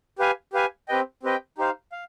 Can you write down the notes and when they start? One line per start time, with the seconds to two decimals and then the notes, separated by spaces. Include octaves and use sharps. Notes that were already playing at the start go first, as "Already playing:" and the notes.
0.19 G4 B4 F5 G#5
0.53 G4 B4 F5 G#5
0.88 C4 G4 B4 D#5 G5
1.23 C4 G4 B4 D#5 G5
1.58 D#4 G4 C5 F5
1.92 F5